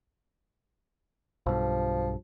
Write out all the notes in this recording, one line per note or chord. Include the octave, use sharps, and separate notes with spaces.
B1 G2 F3